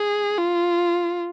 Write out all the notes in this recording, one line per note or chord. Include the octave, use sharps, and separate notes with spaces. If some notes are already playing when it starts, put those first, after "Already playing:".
Already playing: G#4
F4